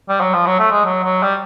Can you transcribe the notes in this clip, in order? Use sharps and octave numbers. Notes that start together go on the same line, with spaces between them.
G3
F#3
F3
F#3
A3
G#3
F#3
F#3
G3